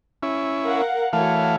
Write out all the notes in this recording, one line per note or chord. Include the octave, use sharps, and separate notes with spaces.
C#4 E4
A#4 F5 F#5
E3 A3 F#4 C#5 F5